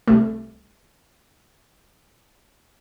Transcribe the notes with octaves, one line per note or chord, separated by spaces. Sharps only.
C2 C3 A3